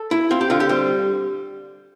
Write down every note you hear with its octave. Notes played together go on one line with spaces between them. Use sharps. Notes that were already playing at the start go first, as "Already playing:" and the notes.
Already playing: A4
E4
C4 F4
G4
D3 F4
G4
G3 C5